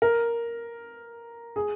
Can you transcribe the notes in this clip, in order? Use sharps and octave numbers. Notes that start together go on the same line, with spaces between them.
A#4
G#4